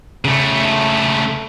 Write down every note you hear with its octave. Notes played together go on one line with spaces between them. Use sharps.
C#3 A3